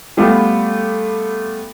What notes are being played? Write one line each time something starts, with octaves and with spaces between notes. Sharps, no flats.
G3 A3 B3 F4 G4